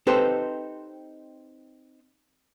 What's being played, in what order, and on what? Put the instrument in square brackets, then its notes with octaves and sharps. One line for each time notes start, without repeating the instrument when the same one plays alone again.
[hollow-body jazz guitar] C4 D#4 G4 A4 B4 C5